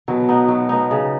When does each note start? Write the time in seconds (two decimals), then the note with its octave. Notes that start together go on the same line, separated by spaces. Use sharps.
0.08 B2 F#3
0.29 B3 D#4
0.48 F#3
0.69 B3 D#4
0.91 C#3